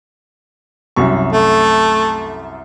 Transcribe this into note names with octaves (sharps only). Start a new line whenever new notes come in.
C2 F#2 C#6
A3